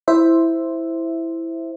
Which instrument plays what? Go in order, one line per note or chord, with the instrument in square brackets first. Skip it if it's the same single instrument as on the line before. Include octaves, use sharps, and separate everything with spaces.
[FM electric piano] E4 C5 E5